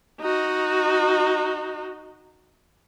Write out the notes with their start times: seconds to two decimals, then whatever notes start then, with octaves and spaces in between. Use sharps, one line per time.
0.21 D#4 F#4